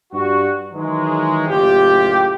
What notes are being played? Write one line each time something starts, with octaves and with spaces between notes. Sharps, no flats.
G2 G3 F#4
D#3 E3 F#3 G#3
F#1 A2 F4 G4